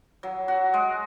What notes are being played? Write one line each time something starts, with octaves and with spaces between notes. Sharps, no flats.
F#3
F#4
G#3